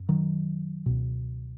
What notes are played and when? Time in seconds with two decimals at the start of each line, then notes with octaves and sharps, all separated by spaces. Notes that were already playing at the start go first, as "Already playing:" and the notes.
Already playing: F#2
0.09 D#3 F#3
0.86 C#2 B2